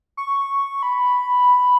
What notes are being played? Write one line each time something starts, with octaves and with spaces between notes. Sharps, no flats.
C#6
B5